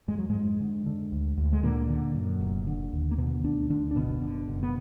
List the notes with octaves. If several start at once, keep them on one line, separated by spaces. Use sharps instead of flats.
F2 G#3
F#3
G#2 G#3
F2
D3
D3
D2
D2
G#3
A#2 D3 A#3
D3
F#2
F1
D3
D#2
A#3
B2 D3 B3
D2 D3 D4
D2 D3 D4
D4
F#1 B2 B3
D3
F#1
B3